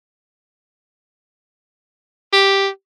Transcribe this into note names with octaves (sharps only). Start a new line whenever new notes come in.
G4